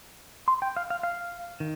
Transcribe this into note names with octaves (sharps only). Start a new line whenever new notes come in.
C6
G5
F5
F5
F5
D#3